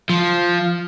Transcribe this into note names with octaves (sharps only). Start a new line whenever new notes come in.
F3